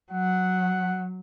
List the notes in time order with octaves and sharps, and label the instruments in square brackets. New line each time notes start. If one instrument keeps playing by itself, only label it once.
[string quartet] F#3 [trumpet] F#5